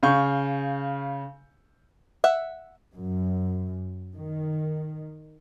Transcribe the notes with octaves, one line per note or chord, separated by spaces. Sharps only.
C#3 F5 C#6 G6
E5 F#5
F#2
D#3